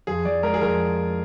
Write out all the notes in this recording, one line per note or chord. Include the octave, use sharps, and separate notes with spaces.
F2 G#4
F2 D5
G#3 A#4
G#4
F2 A#4